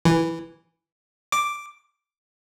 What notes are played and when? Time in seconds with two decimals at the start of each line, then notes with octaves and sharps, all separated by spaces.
0.05 E3
1.32 D6